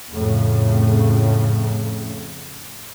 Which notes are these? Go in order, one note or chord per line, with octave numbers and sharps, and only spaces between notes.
F2 A2 C#3